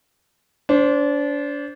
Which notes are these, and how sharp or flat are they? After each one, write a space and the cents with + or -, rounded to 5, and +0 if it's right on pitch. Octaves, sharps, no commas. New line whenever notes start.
D4 -30 C5 +0